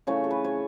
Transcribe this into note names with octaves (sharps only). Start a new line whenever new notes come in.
C#3 E3 A3 C#5
A4
B4
C#5